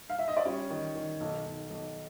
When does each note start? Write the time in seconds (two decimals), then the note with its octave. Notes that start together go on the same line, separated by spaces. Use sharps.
0.10 F5
0.19 E5
0.28 D#5
0.37 D5
0.45 G3 C#4 C#5
0.70 D#3
0.95 D#3
1.20 B1
1.45 B1
1.70 B1